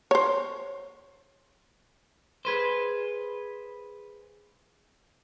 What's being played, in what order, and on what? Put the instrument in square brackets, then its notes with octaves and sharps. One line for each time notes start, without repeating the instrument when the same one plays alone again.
[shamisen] C5 C#5
[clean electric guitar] G#4 B4 C5